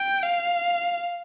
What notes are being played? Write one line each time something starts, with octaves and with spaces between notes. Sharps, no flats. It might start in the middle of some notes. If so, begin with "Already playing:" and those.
Already playing: G5
F5